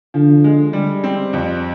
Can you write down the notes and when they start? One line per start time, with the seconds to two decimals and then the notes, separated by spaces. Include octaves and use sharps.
0.14 D3 F3
0.44 G#3
0.73 G3
1.04 C4
1.33 F2